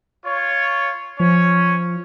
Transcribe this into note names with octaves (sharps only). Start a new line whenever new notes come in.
F4 C#5
F3 C#4 C#5